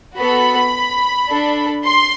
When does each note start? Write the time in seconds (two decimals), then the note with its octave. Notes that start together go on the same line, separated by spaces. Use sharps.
0.17 B3 F#4 A4 B5
1.29 D4 A4
1.84 C6